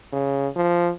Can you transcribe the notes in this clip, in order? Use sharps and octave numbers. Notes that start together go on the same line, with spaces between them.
C#3
F3